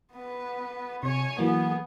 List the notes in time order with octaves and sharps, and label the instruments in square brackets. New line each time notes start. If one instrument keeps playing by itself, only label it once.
[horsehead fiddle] B3 B4
[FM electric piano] C3 [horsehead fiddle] C#5 G#5
[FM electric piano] E3 F#3 A#3 [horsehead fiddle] B3 G#4